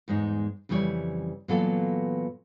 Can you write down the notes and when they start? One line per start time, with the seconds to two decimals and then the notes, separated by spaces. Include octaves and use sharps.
0.08 E2 G#2 G#3 D#4
0.69 F2 C#3 E3 G3 C#5
1.48 A#2 E3 F#3 B3 A4 F5